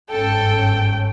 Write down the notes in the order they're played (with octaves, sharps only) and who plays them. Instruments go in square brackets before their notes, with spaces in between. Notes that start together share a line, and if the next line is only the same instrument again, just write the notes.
[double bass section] G1 G#2 C#4 [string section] A4 [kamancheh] G5